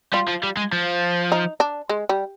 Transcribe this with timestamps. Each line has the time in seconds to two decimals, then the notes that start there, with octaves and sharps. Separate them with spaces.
0.13 G3 F4
0.28 F3
0.43 G3
0.57 G#3
0.72 F3
1.32 D#4
1.60 D4
1.89 G#3
2.09 G3